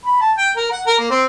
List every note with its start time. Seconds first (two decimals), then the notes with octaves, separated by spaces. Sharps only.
0.06 B5
0.21 A5
0.38 G5
0.56 A#4
0.71 F#5
0.87 A#4
0.98 A#3
1.10 C4